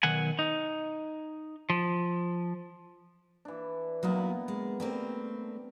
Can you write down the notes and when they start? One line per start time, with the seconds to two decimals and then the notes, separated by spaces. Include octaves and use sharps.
0.03 B1 D#3 F#5 G#5
0.39 D#4
1.70 F3
3.45 E3 D4
4.03 A#2 F#3 B3 D#4 E4 A#4
4.48 G#3
4.80 G3 A3 A#3 C4